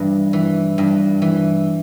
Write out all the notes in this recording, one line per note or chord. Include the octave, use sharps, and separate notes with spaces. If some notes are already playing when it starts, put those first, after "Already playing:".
Already playing: G2 E3
E3
G2
E3